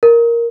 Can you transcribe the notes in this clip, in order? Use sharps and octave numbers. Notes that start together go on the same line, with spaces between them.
A#4